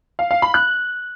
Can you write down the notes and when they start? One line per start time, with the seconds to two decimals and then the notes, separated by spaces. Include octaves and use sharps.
0.19 F5
0.31 F5
0.42 B5
0.54 F#6